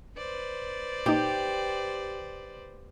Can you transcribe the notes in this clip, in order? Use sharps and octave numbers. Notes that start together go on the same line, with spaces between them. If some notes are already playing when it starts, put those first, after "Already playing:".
B4 C5 D5
A#2 D#4 G4